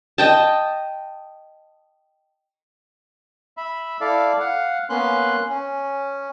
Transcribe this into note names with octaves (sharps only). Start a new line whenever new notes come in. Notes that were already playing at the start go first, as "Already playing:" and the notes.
D#5 G5 A5
E5 B5
E4 A4 D5 F5
F5 F#5
A#3 B3 C#4 C6 F#6
C#4